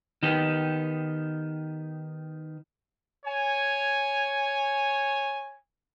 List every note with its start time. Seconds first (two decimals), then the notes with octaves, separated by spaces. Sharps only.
0.23 D#3 B3 D#4 G4
3.25 C#5 G#5